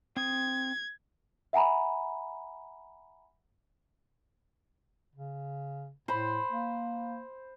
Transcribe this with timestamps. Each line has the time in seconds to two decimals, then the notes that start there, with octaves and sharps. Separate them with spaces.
0.17 C4 D#6 G#6
1.53 E5 F#5 G#5 A#5 B5
5.15 C#3
6.08 A2 C5 B5
6.51 A#3